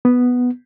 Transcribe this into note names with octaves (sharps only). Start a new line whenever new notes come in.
B3